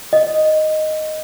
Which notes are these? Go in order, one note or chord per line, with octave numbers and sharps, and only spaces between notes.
D#5